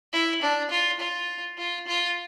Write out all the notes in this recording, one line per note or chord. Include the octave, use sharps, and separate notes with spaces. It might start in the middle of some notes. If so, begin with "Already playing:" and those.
E4
D4
F4
F4
F4
F4